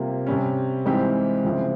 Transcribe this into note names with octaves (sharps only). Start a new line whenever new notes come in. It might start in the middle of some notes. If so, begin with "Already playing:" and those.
Already playing: C3 G3 A#3 F4
C3 G3 C#4
G#2 E3 G3 C4 G4
C#2 C#3 F3 C4 E4